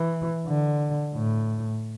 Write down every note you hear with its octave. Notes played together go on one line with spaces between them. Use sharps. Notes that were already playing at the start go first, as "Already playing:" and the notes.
Already playing: E3
D3
A2